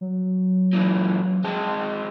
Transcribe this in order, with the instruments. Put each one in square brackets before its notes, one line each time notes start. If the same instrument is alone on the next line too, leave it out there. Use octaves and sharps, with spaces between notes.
[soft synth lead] F#3
[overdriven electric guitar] A#2 E3
[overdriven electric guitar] G#3 C4 [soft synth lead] A5